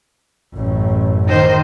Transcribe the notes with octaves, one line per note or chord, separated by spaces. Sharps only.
A1 F#2
D#3 C5 D#5